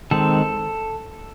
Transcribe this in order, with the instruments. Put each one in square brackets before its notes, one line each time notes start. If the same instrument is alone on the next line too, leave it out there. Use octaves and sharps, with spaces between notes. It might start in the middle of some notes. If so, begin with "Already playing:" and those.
[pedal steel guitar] D#3 G#3 C4 A4